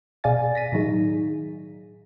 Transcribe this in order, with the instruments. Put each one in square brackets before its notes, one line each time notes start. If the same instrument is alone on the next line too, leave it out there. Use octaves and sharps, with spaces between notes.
[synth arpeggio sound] B2 G#4 D5 F5 G#5 A6
A#6 B6 D#7
A2 D#3 F#3 D#4 G#4